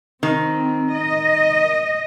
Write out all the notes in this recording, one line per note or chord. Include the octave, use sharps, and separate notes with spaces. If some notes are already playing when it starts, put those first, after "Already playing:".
D#3 C4
D#5